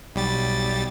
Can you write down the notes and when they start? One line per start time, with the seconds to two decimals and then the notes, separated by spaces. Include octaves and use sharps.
0.15 B1 G3 A6